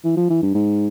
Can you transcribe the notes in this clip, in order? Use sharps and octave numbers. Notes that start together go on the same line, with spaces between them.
E3
F3
E3
G2
G#2